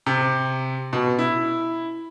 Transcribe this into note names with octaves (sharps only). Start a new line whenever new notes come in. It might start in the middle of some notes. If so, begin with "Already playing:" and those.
C3
B2
E4